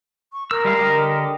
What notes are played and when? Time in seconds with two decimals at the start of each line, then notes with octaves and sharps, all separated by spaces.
0.33 C#6
0.51 A#4 E6
0.65 G3 G#3 F5
0.79 D3 G4 D#5